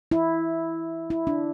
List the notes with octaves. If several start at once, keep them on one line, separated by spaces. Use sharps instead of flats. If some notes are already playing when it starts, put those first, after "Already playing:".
E4
E4
D4